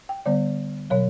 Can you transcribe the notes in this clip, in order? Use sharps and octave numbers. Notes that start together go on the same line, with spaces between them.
G5
D3 G3 B3 D5
B2 F#3 C#5